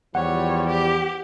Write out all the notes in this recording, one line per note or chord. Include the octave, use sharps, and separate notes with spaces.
E2 F3 G3 C#5 F#5
G4